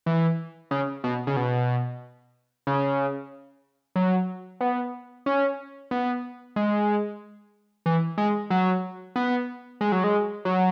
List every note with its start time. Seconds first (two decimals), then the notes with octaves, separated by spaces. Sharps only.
0.06 E3
0.71 C#3
1.04 B2
1.27 C#3
1.36 B2
2.67 C#3
3.96 F#3
4.61 B3
5.26 C#4
5.91 B3
6.56 G#3
7.86 E3
8.18 G#3
8.50 F#3
9.16 B3
9.81 G#3
9.92 F#3
10.04 G#3
10.45 F#3